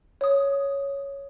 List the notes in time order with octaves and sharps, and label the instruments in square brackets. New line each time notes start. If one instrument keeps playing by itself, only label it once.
[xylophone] C#5 D#6